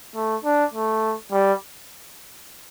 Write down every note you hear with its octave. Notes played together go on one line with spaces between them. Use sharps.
A3
D4
A3
G3